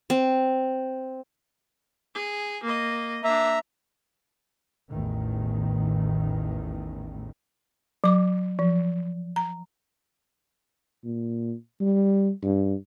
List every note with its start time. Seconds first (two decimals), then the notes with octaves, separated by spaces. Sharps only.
0.10 C4
2.15 G#4
2.63 A#3 D#5
3.24 A#3 D4 E5 A#5
4.90 A1 E2 A2 D#3
8.04 F#3 D6
8.59 F3
9.36 A#5
11.04 A#2
11.80 G3
12.43 G2